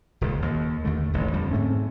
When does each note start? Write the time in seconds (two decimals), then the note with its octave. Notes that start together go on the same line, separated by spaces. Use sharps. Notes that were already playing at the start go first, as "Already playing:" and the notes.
0.21 D#1 C#2
0.42 D#2
0.85 D#2 D3 A3
1.13 D#1 A1 E2 G#2
1.33 F2 D3 G3
1.51 G#2 A3 C4 C#4